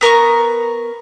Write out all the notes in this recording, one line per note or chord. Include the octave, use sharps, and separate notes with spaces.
B3 A#4 A#5 C#6